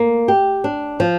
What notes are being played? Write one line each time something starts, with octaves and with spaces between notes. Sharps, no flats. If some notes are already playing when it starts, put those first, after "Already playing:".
Already playing: A#3
G4
D4
F3